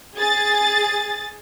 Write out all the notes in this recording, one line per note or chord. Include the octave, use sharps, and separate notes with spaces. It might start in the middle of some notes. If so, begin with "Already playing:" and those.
G#4 A6